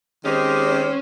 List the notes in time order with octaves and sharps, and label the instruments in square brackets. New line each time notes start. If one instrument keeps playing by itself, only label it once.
[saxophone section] D#3 G#3 C4 G4 C5 [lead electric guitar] C#4